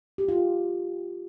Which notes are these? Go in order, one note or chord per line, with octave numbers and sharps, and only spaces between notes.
G4
F4